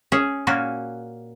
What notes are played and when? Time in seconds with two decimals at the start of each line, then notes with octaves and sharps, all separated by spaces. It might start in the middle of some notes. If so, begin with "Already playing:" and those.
0.12 C#4 G#4 E5
0.47 A#2 A#3 C#4 F#4